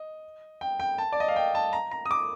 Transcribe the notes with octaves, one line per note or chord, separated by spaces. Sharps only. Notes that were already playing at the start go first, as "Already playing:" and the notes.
Already playing: D#5
G5
G5
A5
D5
D#5
F5
G5
A5
A#5
A#5
D#6
D6